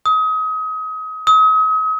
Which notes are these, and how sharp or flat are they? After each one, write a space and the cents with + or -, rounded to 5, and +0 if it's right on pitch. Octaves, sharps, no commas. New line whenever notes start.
D#6 +30
D#6 +40